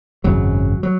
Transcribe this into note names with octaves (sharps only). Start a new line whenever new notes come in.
G#1 F#2 C#3 F#3
F#3